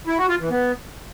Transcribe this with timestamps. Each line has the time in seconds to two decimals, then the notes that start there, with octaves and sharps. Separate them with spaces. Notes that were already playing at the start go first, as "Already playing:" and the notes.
0.07 E4
0.18 F#4
0.29 F4
0.40 E3
0.50 B3